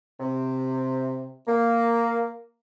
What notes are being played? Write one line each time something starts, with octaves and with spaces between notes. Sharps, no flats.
C3
A#3